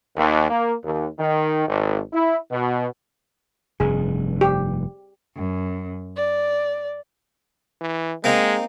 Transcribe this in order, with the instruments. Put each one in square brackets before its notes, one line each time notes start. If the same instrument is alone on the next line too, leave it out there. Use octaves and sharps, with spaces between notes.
[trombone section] D#2
A#3
D#2
D#3
G#1
E4
B2
[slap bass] F1 G2 [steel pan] G#4
[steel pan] G4
[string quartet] F#2
D5
[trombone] E3
[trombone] G#3 [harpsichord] A#3 C4 D#4